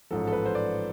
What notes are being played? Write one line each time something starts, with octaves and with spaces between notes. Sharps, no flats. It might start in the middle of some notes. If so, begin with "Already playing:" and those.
A1 G#2 F3 A4
A4
B4
C5
D5